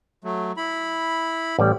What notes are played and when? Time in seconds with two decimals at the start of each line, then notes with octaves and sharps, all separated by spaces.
0.24 F#3 A3
0.57 E4 B5
1.58 A1 G3